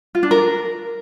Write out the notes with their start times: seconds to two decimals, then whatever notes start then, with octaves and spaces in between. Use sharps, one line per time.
0.15 F4
0.23 D4
0.31 A#4